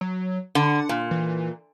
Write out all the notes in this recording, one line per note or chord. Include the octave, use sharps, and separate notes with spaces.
F#3
D3 F#5
A#2
E3